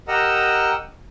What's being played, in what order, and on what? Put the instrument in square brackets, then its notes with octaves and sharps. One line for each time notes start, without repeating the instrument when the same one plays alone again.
[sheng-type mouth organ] G4 A#4 D#5 F#5 A#5 E6